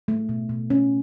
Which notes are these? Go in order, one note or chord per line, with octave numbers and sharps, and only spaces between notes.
A3
B2
B2
C#4